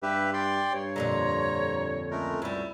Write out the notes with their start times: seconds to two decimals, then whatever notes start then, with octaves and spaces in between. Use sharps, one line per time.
0.03 G2 G4 B4 E5
0.34 D5 G5 C6
0.74 G2 C#5
0.96 F2 A#2 D3 A#5
2.11 C#2 G#3 A3 A#4
2.42 F#2 G3 E4